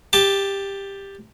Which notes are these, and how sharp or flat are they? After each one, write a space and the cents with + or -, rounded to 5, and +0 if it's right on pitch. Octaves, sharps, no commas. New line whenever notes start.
G4 +10 A5 +0